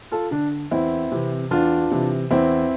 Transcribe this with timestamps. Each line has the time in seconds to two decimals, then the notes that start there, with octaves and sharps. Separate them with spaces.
0.12 F4 A4
0.31 D3 D4
0.71 E2 C4 E4
1.12 C3 E3
1.51 E2 D4 F4
1.91 C3 E3
2.31 E2 C4 E4